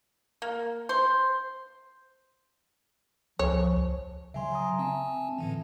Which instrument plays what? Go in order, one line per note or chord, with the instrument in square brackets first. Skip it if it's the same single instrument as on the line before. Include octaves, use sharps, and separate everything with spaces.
[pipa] A#3
C5
[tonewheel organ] C#2 [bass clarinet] F3 [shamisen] C#5
[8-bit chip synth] C#3 F#3 [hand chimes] E5 G#5 C6
[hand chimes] G#5 A#5 D#6
[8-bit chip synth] C4 G#5 A5 [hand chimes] E5
[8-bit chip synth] A2 D3 E3